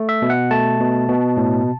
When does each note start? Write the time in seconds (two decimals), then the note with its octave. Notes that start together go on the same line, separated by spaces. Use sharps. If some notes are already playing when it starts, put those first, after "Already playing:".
Already playing: A3
0.09 E5
0.22 B2
0.30 F#5
0.51 A3 A5
0.80 B2
1.09 B2
1.37 A2